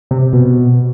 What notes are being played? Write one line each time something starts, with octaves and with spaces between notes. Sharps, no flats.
C3
B2